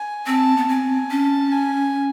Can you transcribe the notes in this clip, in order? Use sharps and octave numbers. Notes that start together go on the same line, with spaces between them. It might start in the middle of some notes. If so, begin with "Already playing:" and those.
Already playing: G#5
C4 A5
B3
C4 G#5
C#4 A5
G#5